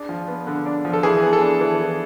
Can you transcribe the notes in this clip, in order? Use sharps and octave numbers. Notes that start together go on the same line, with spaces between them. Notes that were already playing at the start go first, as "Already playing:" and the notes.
Already playing: D4 G#4
F3
B3
D3
D4
F3
A4
E3 G#4
B3
A4
D4
E3
E3